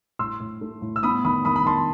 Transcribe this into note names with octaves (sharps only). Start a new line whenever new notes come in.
A2 C6 E6
A2
A3
A2
E6
B3 B5 D#6
D#3 B5 D#6
D#3 B5 D#6
B5
D#3 A5 C6